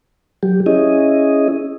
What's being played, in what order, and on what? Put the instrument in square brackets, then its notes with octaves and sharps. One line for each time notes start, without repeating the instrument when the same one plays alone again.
[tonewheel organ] F#3 G4
C#4 E4 G#4 D#5